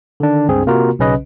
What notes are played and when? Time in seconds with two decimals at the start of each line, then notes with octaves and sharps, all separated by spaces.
0.20 D3 D#3 D4
0.48 C#2 G2 C4 G#4
0.67 C3 A#3 F4 F#4 A#4
0.99 B1 C#3 C#4 B4 D#5